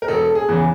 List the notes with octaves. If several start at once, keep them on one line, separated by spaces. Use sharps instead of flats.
A#4
E1 A4
G#4
E2 C#3 E3